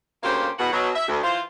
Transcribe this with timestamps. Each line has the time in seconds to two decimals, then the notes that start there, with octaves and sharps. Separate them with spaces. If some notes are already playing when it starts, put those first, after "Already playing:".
0.24 D2 C#3 A#3 G4 C5 F5
0.59 E2 B2 F#5
0.72 B2 F#3
0.95 E5
1.08 D2
1.24 E3 F4 C5